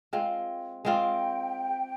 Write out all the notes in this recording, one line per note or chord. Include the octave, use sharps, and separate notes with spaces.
G#3 C4 F4
G#3 C4 F4 G5